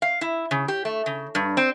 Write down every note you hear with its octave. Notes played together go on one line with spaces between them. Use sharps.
F5
E4
C#3
G4
A3
C#3
G2
C4